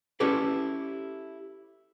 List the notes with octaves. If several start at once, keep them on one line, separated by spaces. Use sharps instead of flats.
C#4 E4 G4 A4 B4 D5